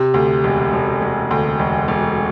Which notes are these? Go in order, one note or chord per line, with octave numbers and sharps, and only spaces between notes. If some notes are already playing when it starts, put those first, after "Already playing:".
Already playing: C3
D2
E1
E1
E1
D2
E1
E1